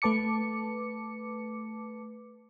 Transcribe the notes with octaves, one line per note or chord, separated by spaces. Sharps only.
A3 B4 A5 D6 C#7